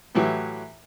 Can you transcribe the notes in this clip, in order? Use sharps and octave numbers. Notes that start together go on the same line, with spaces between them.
A2 E3 F#3 G4